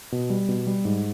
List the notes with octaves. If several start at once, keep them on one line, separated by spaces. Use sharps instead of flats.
B2
G3
B2
G3
G#2